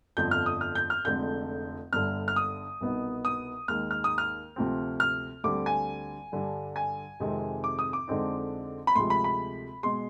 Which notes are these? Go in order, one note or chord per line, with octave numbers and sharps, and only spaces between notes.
G1 F2 D3 F3 G6
F6
D#6
F6
G6
F6
F1 F2 D3 G#3 G6
G1 G2 D3 F6
F6
D#6
C2 B2 B3 D#4
D#6
D#2 D#3 G#3 F6
F6
D#6
F6
D2 C3 F3 C4
F6
D2 D3 G3 C4 D6
G#5
G2 D3 G3 D4
G#5
F2 C3 D#3 G#3 C4
D6
D#6
D6
F2 D3 G#3 C4 D#4
B5
D2 C3 F3 G#3 C6
B5
B5
B2 G#3 C6